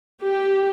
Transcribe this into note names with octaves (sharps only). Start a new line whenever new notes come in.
G4